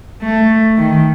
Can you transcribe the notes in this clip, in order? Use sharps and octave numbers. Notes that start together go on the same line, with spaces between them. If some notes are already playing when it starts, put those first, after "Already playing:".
A3
D#3